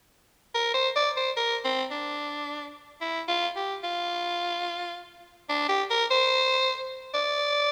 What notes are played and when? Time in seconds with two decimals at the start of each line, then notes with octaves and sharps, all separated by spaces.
0.55 A#4
0.74 C5
0.96 D5
1.17 C5
1.37 A#4
1.65 C4
1.91 D4
3.01 E4
3.28 F4
3.56 G4
3.84 F4
5.49 D4
5.69 G4
5.90 A#4
6.11 C5
7.14 D5